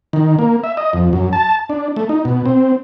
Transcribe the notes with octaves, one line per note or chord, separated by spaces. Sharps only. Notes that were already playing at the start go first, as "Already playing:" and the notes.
D#3
A#3
E5
D#5
F2
F#2
A5
D4
A3
D#4
B2
C4